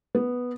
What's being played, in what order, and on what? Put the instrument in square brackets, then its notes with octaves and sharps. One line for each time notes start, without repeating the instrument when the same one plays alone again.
[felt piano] B3